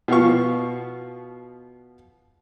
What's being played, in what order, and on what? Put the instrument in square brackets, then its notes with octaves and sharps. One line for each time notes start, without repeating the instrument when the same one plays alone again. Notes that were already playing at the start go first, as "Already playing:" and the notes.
[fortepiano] B2 F3 B3 F5 C#6